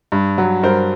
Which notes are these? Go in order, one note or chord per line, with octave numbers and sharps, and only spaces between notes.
G2
F#3
G2 A#4 C5